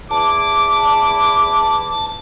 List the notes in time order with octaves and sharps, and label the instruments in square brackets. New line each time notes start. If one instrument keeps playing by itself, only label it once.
[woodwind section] E2 E4 D6 [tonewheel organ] A5